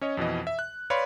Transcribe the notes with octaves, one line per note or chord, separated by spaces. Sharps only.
C#4 C#5 D#5
F2 B2 E3 D#5
E5
F#6
B4 C#5 D5 F5 B5 C6